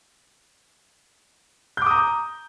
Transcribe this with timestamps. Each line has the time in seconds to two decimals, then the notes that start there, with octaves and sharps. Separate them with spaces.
1.77 G6
1.82 D6
1.86 D#6
1.91 A#5